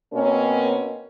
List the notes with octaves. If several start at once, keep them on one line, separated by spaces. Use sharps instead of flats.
B2 A#3 C4 C#4 A#4 C#5